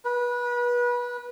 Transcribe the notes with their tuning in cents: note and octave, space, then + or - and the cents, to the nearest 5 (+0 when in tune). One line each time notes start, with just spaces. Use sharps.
B4 -25